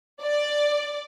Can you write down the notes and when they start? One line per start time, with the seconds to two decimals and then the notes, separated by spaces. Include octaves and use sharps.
0.22 D5